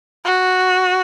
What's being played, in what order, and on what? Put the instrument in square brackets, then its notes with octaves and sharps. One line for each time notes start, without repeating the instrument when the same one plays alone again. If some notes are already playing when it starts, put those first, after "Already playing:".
[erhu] F#4